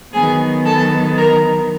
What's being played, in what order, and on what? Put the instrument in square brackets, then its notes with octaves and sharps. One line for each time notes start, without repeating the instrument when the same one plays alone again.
[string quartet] D#3 F#3 B3 G#4 G#5
A4 A5
A#4 A#5